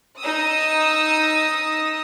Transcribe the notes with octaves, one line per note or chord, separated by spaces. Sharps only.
D#4 D#6 E6